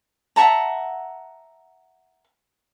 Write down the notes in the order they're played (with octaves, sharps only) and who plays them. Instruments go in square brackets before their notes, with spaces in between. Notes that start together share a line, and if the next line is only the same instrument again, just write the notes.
[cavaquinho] E5 F#5 A5 A#5